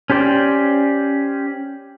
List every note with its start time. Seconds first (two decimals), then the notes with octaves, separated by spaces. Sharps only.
0.10 C#4 G4 C5 D5 G5